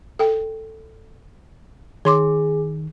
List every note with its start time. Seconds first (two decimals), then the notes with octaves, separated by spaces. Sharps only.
0.19 A4 G5
2.05 D#3 G#4 C#5 C6 D6